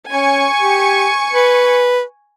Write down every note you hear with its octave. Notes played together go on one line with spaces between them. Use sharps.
C#4 G#5 C#6 C#7
G4
B4